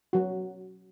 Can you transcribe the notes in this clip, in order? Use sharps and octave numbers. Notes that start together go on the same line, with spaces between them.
F#3 F#4